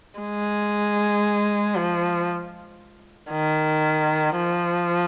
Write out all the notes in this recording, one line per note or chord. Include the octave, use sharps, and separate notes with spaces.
G#3
F3
D#3
F3